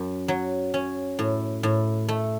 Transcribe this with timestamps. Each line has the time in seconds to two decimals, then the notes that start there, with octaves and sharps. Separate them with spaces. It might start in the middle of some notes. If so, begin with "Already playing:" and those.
Already playing: F#2
0.28 F#3
0.74 C#4
1.19 A2
1.63 A2
2.09 A3